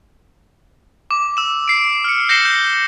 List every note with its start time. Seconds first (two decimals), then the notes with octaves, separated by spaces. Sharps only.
1.11 D6
1.37 E6 E7
1.68 C7 D7
2.04 F6 C#7
2.29 G6 A#6 C7 C#7 E7 G7
2.45 G6